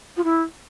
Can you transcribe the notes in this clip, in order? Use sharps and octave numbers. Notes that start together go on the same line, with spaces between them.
F4
E4